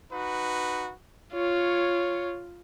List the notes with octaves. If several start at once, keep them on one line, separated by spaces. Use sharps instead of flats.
D#4 F#4 B4
F4 C#5